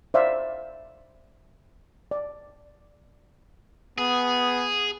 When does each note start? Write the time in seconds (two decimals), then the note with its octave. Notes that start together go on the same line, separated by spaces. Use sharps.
0.14 C5 D5 E5 F5
2.11 D5
3.98 B3 G#4